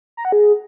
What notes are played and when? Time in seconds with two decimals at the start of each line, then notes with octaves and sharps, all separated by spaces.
0.17 A#5
0.25 F#5
0.32 G#4